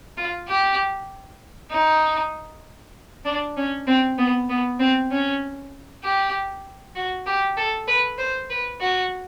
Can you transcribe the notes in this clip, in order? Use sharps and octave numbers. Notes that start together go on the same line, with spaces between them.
F4
G4
D#4
D4
C#4
C4
B3
B3
C4
C#4
G4
F#4
G4
A4
B4
C5
B4
F#4